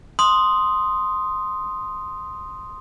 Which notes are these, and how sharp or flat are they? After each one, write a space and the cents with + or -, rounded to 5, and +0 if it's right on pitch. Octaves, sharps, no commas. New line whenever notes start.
C6 +0 D#6 +0